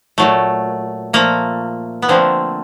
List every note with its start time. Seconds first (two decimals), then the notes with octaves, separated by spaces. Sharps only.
0.18 A#2 F#3 A3
1.13 A#2 F3 A3 A#3
2.02 B3
2.08 D3 F3 A3 A#3 C4